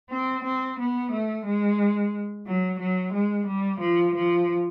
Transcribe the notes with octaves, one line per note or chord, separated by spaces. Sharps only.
C4
C4
B3
A3
G#3
F#3
F#3
G#3
G3
F3
F3